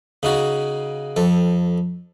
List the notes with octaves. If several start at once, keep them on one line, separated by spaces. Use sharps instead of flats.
C#3 D#4 F#4
F2 A4